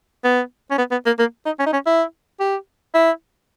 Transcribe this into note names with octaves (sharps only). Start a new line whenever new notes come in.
B3
C#4
B3
B3
A#3
A#3
D#4
C#4
D#4
C#4
E4
G4
E4